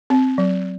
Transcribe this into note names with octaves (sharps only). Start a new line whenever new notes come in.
C4
F#3